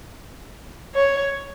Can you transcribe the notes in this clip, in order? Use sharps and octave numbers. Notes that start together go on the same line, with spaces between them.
C#5